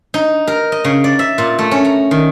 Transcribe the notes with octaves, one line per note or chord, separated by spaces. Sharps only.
D#4
A#4
D#5
C#3
D5
E5
A#2
A3
C#4
A#5
D#3